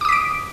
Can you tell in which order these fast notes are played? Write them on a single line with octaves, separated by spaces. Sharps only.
D6 D#6 B6 D7